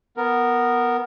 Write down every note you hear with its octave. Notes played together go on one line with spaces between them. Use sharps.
B3 A#4